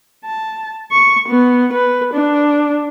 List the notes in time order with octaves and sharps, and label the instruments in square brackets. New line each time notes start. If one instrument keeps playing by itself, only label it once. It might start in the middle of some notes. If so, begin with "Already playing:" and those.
[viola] A5
C#6
B3
B4
D4